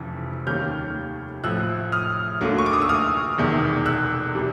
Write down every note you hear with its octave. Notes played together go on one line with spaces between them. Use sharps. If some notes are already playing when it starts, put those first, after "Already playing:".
Already playing: F1 F2 C#3 E3
D#2 D#3 G3 A#3 C#4 F6 G6
A1 A2 F3 E6 F#6
D#6 F6
D2 D3 F#3 A#3
C#6
D6
D#6
E6
D#6 F6
E1 E2 C3 D#3
E6 F#6
C3 E3 G3